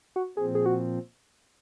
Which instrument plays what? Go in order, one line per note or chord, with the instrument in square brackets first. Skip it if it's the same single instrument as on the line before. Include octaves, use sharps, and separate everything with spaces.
[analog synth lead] F#4
[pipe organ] A#2 F3 C4 [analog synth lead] G#4
[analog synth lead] G#4
F#4